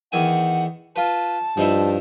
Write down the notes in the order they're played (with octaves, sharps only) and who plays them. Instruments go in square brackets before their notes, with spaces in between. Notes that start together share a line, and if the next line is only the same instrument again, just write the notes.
[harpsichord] E2 D#3 G#5 [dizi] F#5
[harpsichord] F4 B4 [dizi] A5
[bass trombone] G2 [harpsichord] F3 D#4 E4